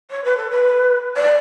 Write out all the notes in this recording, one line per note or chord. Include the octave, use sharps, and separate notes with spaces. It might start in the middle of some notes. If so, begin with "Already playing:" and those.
C#5
B4
A4
B4
D5